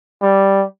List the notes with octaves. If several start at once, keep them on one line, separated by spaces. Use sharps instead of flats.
G3